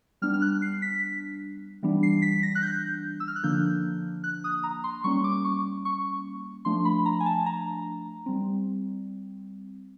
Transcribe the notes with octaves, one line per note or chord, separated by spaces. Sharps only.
G3 B3 D4 F6
F6
F#6
C7
B6
E3 G3 B3 D4
C7
B6
A#6
F#6
G6
E6
F6
F#6
D3 F3 A#3 D4 G6
F#6
D#6
A#5
C6
G3 A#3 C#4 C#6
D6
C#6
C#6
F3 A3 D4 C6
B5
A#5
G#5
A5
A#5
G3 C4